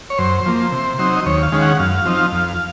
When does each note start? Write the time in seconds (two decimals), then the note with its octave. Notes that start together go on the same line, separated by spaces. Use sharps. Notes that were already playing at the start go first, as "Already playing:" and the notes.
0.10 C#5
0.18 F#2 C5
0.46 F3 A#3
0.72 C3
0.99 F#3 C4 D#4
1.16 D#5
1.26 D#2 C#5
1.43 F5
1.52 D#3 G#3 C#4
1.62 F#5
1.79 F#2 F5
2.05 F3 C4 D#4
2.32 F2